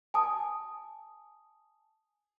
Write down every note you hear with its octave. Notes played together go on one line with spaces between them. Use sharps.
G#5 A5 D#6